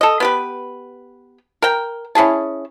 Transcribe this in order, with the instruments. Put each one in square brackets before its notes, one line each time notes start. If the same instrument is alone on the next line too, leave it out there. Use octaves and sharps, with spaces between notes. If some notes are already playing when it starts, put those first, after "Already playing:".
[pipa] A4 D#5
B3 G4 B4
A#4 G5
C#4 E4 G#4 A5